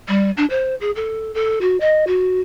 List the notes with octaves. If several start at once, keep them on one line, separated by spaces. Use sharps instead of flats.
G3
D4
C5
G#4
A4
A4
F#4
D#5
F#4